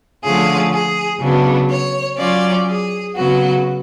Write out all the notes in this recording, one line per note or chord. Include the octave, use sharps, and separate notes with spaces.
D3 F3 A3 C#4 F4 G#4
G#4
C#3 F#3 B3 D4
C#5
F#3 C#4 F4 D5
G#4
C#3 F#3 B3 F#4